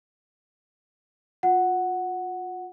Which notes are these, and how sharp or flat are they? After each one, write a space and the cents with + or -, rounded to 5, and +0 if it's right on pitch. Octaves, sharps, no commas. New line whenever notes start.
F4 +30 F#5 +0